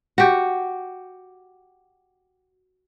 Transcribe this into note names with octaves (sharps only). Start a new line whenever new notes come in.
F#4 G4